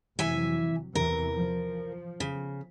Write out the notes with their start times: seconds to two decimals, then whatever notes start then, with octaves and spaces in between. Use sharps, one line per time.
0.19 F1 C3 E3 F#3 E5 G#5
0.95 E2 C3 E3 A#4
1.35 F3
2.20 C#3